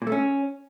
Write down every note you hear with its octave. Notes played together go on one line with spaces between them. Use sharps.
A#2
A3
C#4